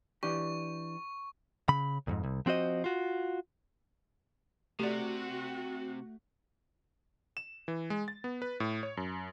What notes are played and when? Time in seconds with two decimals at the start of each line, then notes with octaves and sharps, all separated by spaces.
0.23 E3 D4 G4 C#6
1.69 C#3 B5
2.07 C2 F2 G#2
2.24 C2
2.46 F3 C4 F#4 C5 D#5
2.84 F4 F#4
4.79 C3 A3 F#4 G4 D5
7.37 E7
7.68 E3
7.90 G#3
8.08 A6
8.24 B3
8.42 B4
8.60 A2
8.83 C#5
8.97 F#2